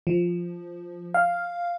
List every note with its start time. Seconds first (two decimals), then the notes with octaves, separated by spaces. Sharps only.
0.07 F3
1.14 F5